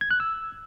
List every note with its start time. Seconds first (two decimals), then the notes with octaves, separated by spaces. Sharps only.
0.01 G#6
0.11 F#6
0.20 E6